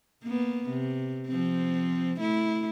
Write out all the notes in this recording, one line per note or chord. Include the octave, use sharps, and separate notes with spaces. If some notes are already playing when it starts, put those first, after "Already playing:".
A#3 B3
C3
F3 C4
A3 E4